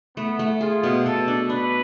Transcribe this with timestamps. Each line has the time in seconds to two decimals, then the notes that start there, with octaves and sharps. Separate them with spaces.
0.17 A3 B3
0.39 A3
0.61 F4 G#4
0.83 B2
1.06 B2 A4
1.28 D4
1.49 D4 B4